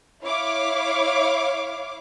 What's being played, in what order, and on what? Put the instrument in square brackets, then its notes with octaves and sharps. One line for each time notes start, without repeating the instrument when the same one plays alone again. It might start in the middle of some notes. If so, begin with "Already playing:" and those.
[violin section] E4 C#5 F5 D6